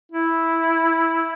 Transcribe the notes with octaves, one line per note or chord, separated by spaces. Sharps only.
E4